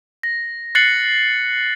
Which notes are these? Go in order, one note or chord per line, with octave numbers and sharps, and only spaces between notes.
A#6
F#6 A6 C7 C#7 F#7